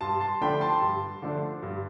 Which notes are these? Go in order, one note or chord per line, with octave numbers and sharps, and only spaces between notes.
G2 A5 C6
A5 C6
D3 F3 A3 D4 G5 B5
A5 C6
G2
D3 F3 A3 D4
G2